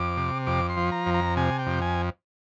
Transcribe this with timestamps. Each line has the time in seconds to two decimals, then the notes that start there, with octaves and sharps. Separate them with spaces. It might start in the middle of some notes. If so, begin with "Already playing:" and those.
Already playing: F2 D6
0.17 C3
0.47 F2 D6
0.69 C6
0.77 F3
0.92 A#5
1.06 F2
1.14 A#5
1.37 C3 G#5
1.59 G5
1.66 F2
1.82 G#5